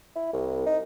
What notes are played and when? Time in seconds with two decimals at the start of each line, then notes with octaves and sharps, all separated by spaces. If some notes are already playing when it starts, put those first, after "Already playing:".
0.16 E4
0.33 C2
0.66 D#4